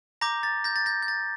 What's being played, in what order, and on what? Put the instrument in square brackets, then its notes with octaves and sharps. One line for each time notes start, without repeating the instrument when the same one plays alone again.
[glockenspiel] A#5 D6 G6 A#6
A6
G6 A#6
A6
G6 A#6
G6
A6